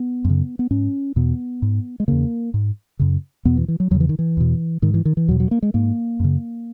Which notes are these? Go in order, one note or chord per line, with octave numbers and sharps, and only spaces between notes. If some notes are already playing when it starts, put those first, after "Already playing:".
Already playing: B3
F#2 C#3
B3
G#2 C#4
E2 B2 B3
G#2
G#3
E2 C#3 A#3
G#2
F#2 C#3
E2 B2 B3
E3
E3
F#3
E2 C#3 F#3
E3
D#3
E3
E2 B2
G#2 D#3
E3
D#3
E3
E2 B2 F#3
F#3
A#3
G#3
G#2 A#3
F#2 C#3